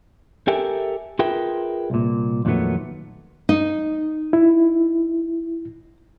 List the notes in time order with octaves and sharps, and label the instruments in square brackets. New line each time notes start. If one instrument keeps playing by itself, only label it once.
[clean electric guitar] G4 A4 A#4 E5 G5 G#5
F4 G#4 A#4 B4 E5 G5
C2 A#2
F2 A#2 D#3 F#3 A3 B3
[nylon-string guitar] D#4
[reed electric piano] E4